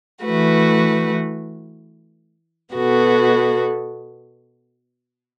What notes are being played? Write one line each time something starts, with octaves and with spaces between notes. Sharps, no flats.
E3 A3 F#4 B4
B2 B3 F#4 A4